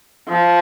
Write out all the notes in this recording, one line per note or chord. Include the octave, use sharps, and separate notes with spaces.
F3